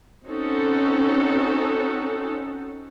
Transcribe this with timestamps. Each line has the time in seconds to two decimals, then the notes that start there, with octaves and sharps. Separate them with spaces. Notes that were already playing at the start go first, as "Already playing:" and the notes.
0.27 C4 C#4 D#4 F#4 A4